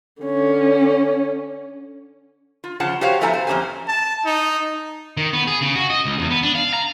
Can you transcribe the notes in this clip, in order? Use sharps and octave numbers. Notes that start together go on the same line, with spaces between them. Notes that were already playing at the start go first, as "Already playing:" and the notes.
D3 C#4
F4
C#3 F3 F4 F#5 A5
F#4 G4 C5 C#5 F5
F3 A3 B3 E4 G#5 A#5
C5
F2 A#3 C#4 G4 C5 G#5
A5
D#4
D#3
B3
G#4
C#3
F#4
D#5
C#2
E2
B3
D4
F5
A#5